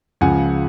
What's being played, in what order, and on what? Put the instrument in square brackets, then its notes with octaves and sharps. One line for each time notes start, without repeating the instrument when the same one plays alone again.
[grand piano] C#2 C#3 F3 F#5 G#5